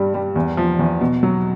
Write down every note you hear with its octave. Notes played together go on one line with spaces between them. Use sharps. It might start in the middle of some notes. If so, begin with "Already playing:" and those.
Already playing: G2 G3
G3
E2
F3
E2
B2
F#3